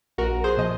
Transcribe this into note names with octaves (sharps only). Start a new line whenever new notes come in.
A#1 F#4 A#4
G#4 C5
A#2 F3 D#5